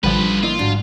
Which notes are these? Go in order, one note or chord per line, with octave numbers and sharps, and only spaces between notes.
A1 D3 F3 G3 F4 B4
A#3 E4 F4 D#5
G#2 D4 F#4